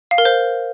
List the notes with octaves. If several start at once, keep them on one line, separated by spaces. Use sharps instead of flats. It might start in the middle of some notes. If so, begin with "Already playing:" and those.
F5
A#4
C5